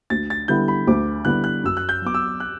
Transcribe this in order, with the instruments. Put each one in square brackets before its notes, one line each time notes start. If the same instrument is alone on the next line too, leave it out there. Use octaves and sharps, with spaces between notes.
[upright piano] D2 [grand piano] A6
[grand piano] A6
[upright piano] D3 G3 B3 E4 [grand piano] G6
[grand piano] B5
[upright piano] D2 [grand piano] D6
[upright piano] D3 G3 B3 E4 [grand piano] F#6
[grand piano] F#6
[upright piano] F#2 [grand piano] E6
[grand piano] F#6
G6
[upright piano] F#3 B3 [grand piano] D6
[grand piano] E6
F#6